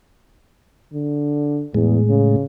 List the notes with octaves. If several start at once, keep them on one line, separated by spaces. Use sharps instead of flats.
D3
E2 A2 G#3
C#3